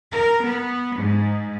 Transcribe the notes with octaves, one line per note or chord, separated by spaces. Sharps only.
A#4
B3
G#2